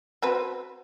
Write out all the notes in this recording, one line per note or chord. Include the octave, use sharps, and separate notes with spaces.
C4 F#4 B4